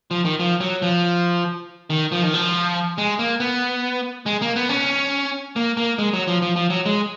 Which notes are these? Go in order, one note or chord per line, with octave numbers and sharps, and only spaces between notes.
F3
D#3
F3
F#3
F3
D#3
F3
D#3
F3
G#3
A#3
B3
G#3
A#3
B3
C#4
A#3
A#3
G#3
F#3
F3
F3
F3
F#3
G#3